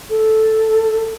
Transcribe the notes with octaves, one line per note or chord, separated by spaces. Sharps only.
A4